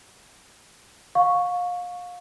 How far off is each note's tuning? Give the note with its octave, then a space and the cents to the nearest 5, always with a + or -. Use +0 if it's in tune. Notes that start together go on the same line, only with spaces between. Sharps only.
F5 +30 C#6 +0